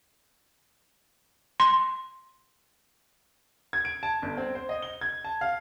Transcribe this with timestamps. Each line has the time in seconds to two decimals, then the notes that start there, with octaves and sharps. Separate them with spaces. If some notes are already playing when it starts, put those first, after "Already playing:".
1.60 C6
3.73 G#6
3.85 D7
4.03 A5
4.22 G1
4.38 C4
4.55 C5
4.69 D#5
4.82 G7
5.01 G#6
5.25 A5
5.41 F5